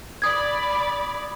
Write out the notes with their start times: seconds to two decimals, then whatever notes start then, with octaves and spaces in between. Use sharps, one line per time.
0.22 D5 B5 D#6 G#6